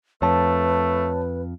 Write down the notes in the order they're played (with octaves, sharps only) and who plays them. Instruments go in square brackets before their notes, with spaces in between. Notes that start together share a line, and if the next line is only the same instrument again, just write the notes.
[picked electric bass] F2 [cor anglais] A3 [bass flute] B4 [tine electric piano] C#5 A5